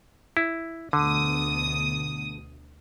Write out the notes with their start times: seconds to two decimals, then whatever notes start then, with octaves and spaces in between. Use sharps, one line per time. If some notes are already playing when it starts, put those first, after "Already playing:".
0.37 E4
0.93 D2 B2 D3 D#6